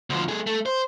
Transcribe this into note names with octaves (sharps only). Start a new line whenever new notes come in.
D2 F3
A3 G#4
A3
C5